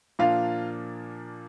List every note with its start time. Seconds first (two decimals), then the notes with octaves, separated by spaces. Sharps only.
0.19 A#2 F3 A#3 D4 F4 F5